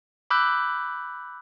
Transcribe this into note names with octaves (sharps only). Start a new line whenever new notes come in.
B5 D6 E6 F#6 G6